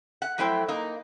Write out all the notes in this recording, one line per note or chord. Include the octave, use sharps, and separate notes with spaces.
F#5
F2 F#3 A3 E4 C5 G5
A#3 D#4